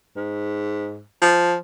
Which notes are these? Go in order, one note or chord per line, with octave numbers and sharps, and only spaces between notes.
G#2
F3